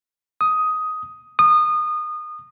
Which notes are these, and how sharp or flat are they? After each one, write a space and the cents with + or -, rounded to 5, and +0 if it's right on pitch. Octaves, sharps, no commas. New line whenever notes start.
D#6 +10
D#6 -25